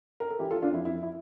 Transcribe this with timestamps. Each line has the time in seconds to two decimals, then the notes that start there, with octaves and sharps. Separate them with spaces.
0.20 A#4
0.30 A4
0.39 E3 E4 G4
0.51 F4 A4
0.55 E3
0.62 D4 F4
0.70 F2 E4
0.85 F2 E4
1.03 E4